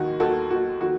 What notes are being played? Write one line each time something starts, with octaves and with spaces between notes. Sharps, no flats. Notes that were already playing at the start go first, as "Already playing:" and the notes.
Already playing: D#2 D#3 F#4
D#2 F#4 A4
D#2 F#4
D#3 F#4